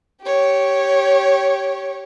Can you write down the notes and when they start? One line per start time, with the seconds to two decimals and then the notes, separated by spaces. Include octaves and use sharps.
0.22 G4 C#5